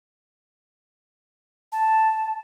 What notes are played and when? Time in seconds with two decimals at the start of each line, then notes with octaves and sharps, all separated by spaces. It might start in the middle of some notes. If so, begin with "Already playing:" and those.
1.72 A5